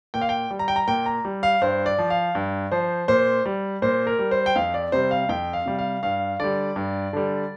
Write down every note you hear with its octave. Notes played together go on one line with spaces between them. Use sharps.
A#2 G5
F5
G5
G3
A#5
G5
A#5
A#2 G5
A#5
G3
F5
G2 C5
D5
F3
F5
G2
F3 C5
A#2 C5
G3
A#2 C5
A#4
G3
C5
G5
F2 F5
D5
C3 G3 C5
F5
F2 G5
F5
C3 G3
F5
G2 F5
D3 G3 D5
G2
D3 G3